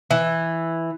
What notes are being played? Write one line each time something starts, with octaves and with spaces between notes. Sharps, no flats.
E3